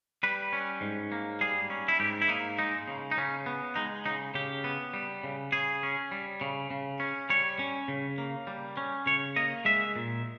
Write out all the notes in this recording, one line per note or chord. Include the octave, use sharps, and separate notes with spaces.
G3 B4
C#4
G#2
A#3
G3 G#4
C#4
E4
G#2 G4
E4
A#3 D#4
G#3 D#4
C#3
D#4
C#3 C#4
B3
G#3 D#4
C#3 D#4
C#3 G4
B3
G3
C#3
C#3 G#4
C#4
G3
C#3
C#3
C#4
G3 C#5
C#4
C#3
A#3
G3
C#4
C#3 C#5
A#3 D#5
G#3 E5
A#2